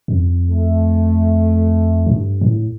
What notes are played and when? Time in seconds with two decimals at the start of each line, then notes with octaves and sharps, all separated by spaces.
0.08 F2
0.50 A3
2.06 A2
2.14 G2
2.41 A2